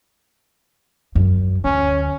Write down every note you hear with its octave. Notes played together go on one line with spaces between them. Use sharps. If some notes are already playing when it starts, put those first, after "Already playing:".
F#2
D2 C#4